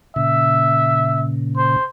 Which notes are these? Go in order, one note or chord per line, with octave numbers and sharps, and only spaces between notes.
A#2 C#3 E5
C5